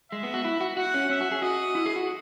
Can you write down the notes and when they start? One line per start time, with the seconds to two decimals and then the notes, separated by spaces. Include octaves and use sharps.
0.12 G#3 E5
0.23 B3
0.34 F#4
0.45 E4
0.61 F#4
0.77 F#4 F#5
0.94 C#4
1.10 C#4 E5
1.21 F#4
1.32 G#4
1.42 F#4 D#5
1.75 E4
1.86 G#4
1.96 F#4